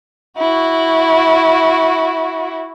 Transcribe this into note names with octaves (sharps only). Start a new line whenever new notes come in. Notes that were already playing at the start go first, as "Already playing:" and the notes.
E4 F#4